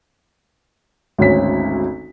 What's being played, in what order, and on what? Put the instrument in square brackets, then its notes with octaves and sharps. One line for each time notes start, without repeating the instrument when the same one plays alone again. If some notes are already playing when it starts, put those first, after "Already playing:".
[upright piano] G#1 D2 C#4 C#5 B6